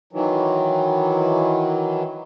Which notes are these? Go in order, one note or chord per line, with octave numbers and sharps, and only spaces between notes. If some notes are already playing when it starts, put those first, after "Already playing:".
D#3 E3 F#3